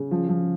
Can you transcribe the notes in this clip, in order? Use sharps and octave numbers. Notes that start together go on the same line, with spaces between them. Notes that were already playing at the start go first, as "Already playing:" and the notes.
Already playing: C#3
F3
F3